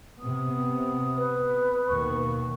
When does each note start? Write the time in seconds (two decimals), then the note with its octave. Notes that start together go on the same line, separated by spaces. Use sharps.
0.20 C3 B3 D#6
1.17 B4
1.88 D#2 B2 D#3 C#6